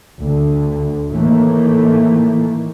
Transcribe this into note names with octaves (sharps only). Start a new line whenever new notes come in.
D2 D3
A2 D#3 E3 A3 A#3